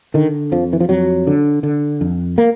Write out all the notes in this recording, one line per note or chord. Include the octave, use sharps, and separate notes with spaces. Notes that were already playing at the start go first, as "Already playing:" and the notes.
D3 D#3
F2 F3
E3
F3
F2 F#3
D3
D3
F2
A#3